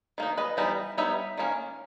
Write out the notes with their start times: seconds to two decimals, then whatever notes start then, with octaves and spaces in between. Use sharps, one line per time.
0.18 D#3 A#3 D#4
0.37 B4 D#5
0.57 E3 G3 B3 D#4
0.97 G3 B3 D#4 C#5 E5
1.38 D#3 A#3 C#4